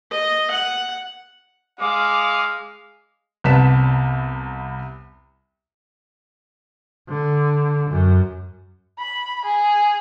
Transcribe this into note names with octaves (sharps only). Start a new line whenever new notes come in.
D#5
F#5
G#3 F5 D6
C2 C3 B3 A5 B6 E7
D3
F#2
B5
G#4